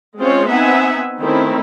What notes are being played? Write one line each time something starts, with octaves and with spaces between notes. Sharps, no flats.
G#3 C4 C#4 F4 C5 C#5
B3 C4 D#4 E5 F#5 G#5
D#3 A3 C4 C#4 E4